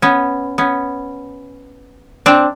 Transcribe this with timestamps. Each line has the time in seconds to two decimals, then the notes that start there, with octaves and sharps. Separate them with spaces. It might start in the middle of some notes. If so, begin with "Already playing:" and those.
0.02 B3 C#4
0.58 B3 C#4
2.26 C4 D4